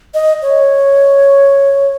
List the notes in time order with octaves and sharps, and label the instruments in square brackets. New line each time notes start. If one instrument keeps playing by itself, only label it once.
[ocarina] D#5
C#5